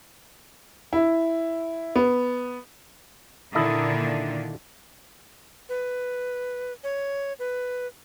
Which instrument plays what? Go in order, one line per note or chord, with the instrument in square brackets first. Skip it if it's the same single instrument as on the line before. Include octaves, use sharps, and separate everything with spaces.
[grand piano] E4
B3
[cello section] A#2 D3 D#3 [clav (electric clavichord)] E4 A4 D#5
[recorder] B4
C#5
B4